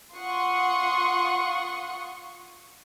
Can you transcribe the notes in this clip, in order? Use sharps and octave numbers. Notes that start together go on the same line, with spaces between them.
F4 F#5 C6 C#6 D#6